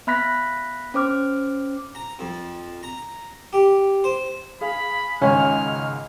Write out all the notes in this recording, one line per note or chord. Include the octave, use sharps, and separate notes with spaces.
B3 E5 B5 F#6 A#6 B6
C#4 C5 D6 F6
A#5
F2
A#5
G4
C5
G#4 F5 B5
C#2 G#2 D#3 C#4 F6